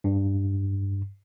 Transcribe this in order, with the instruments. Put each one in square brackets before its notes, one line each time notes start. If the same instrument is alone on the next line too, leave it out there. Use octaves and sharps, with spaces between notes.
[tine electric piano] G2